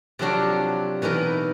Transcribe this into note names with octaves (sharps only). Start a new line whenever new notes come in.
C3 F3 F#3 C4 D4 F#4
B2 E3 D#4 A#4 B4